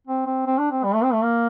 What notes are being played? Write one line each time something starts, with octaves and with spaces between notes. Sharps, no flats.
C4
C4
C4
D4
C4
G3
A3
C4
A3
A#3